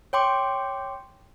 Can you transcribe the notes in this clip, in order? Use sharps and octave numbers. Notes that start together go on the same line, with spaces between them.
C#5 G5 C6 D6